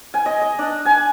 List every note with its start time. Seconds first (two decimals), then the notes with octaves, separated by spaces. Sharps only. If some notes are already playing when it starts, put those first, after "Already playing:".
0.14 G#5
0.26 D#5
0.42 D#5
0.59 D4
0.85 G#5